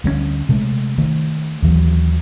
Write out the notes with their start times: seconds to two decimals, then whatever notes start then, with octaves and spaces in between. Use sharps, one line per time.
0.04 D2 G3 B3 C#4
0.49 C3 G#3 A3
0.98 D#3 A3
1.62 D#2 E3 F#3